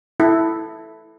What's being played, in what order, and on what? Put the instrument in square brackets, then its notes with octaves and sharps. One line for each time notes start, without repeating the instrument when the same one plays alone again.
[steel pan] E4 A4